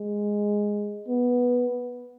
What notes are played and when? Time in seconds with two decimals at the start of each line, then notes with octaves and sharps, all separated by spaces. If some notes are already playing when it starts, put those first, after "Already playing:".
Already playing: G#3
1.08 B3